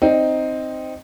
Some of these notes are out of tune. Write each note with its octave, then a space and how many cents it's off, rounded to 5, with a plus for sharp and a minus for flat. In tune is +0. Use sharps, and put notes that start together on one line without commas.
C4 +0 D#4 +0 D5 +0